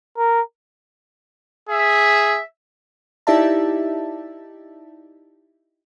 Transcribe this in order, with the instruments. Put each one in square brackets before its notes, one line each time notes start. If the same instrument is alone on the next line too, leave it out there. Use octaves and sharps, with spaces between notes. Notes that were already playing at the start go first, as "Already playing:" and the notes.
[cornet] A#4
[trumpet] G#4 [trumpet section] E5
[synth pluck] D#4 E4 G4 D5 E5 A5